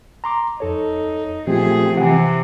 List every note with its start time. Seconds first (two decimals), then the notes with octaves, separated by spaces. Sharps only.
0.24 A#5 C6 D6
0.60 F2 D#4 A4 C#5
1.47 A#2 F3 A3 C4 F4 G4 G#4
1.97 C3 E3 F#5 G#5